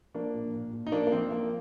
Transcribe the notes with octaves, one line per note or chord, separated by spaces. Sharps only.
F3 A#3 D4
A#2
A#2
A#2
D#4
F3 A#3 D4
A#3
F3 C4
F3 A#3